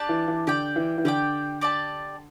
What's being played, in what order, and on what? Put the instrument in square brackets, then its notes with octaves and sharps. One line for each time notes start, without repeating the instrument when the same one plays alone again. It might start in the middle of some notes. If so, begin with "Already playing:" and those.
Already playing: [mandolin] D4 G4 D5 A5
[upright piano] E3
E3
[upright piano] D3 [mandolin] G4 D5 G5
[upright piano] E3
E3
[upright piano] D3 [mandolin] G4 D5 G5
[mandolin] G4 D5 A5